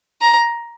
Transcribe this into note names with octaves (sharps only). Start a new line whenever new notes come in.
A#5